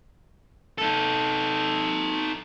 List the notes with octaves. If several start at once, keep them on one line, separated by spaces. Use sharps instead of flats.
D#4 A4